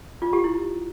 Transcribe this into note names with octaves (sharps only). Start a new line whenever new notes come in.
F4
G4
E4